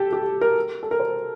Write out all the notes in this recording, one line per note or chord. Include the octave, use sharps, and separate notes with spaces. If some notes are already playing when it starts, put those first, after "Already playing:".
Already playing: G4 A4
G4
A#4
A4
A#4
C5